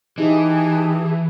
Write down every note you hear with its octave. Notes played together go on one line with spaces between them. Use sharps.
E3 D#4 G4 G#4 A5